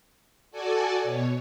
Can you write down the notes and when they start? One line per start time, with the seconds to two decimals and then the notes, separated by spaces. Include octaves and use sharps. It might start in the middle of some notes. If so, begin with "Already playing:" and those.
0.51 F#4 A4 D5 G#5 A5
1.03 B2 C#5